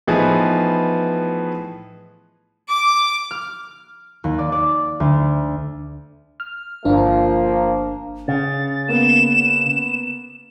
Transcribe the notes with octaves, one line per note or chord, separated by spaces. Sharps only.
A2 E3 F3 B3 D#4 G#4
D6
F6
D#2
D5
D5
D2
F6
G1 F3 A#3 D4
C#3 A6
A#3 B3 E7